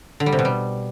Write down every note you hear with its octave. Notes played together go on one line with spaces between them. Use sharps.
D3
G3
C3
B2
G3